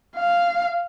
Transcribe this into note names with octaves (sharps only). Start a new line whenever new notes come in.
F5